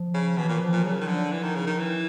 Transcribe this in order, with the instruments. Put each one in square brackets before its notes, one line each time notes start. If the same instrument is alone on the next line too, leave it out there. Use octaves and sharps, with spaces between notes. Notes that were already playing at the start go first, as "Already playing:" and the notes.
Already playing: [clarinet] F3
[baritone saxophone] C#3
[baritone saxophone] B2 [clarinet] E3
[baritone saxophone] A#2
[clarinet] F3
[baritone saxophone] A#2
[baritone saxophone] C#3 [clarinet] F#3
[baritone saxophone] D#3 [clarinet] F3
[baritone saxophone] D3
[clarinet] F3
[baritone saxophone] E3
D#3
C#3
D#3
E3